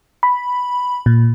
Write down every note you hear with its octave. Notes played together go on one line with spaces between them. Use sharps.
B5
A#2